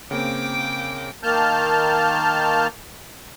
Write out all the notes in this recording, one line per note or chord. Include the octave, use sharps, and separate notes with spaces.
C#3 A#3 C4 G5 D6
D#3 A#3 A5 F6 G6